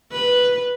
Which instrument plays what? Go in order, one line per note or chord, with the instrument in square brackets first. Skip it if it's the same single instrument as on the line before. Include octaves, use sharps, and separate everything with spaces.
[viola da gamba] B4